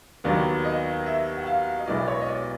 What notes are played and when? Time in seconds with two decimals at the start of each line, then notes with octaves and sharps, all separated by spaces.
0.24 D#2 D#3 F#3 B3 D5
0.65 D#5
1.06 E5
1.37 F#5
1.46 F5
1.79 D#5
1.86 B1 B2 G#3 B3 E4 D5
2.08 C#5
2.21 D#5
2.28 D5